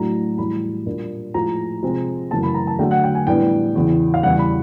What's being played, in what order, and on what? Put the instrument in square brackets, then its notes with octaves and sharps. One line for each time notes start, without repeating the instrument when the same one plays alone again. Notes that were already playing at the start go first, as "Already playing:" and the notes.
Already playing: [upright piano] A2 F#3 A3 D4 A#5
A2 E3 G3 B5
A#2 G3 A#3 D4
A2 F3 G#3 A#5
C3 F3 G#3 C4
F#2 C#3 E3 A3 A5
B5
A#5
A5
D3 F#3 A3 D4 G5
F#5
G5
G#5
A2 E3 G3 B3 D4 G5
E2 C#3 E3
F5
E2 C#3 E3 G3 F#5
B5